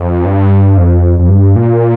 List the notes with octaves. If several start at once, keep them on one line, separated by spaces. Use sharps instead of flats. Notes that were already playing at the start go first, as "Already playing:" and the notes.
Already playing: F2
G2
F2
F2
G2
A#2